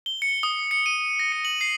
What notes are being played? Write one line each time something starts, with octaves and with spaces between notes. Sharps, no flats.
G7
C#7
D#6
C#7
D#7
A#6
C#7
F#7
C7